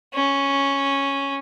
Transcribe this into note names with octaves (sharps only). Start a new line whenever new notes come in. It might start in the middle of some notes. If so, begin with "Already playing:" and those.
C#4